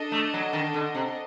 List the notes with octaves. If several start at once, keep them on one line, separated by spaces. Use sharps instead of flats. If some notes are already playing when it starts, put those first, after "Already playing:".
Already playing: D4 A4 D#5
A3
F#3
D#3
D3
C3